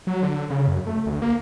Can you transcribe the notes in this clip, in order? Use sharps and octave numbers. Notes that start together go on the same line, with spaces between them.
F#3
D3
C#3
F#2
A3
D2
A#3